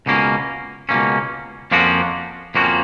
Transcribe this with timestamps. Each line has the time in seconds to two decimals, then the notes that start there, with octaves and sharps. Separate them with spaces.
0.06 C#2 B2 A#3 C#4
0.89 C#2 B2 A#3 C#4
1.71 F2 F3 A#3 C#4 F#4
2.55 F2 F3 A#3 C#4 F#4